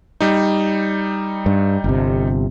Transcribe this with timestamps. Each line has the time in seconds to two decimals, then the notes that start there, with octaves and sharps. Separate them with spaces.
0.21 G3 D#4
1.46 G2
1.84 G1 C3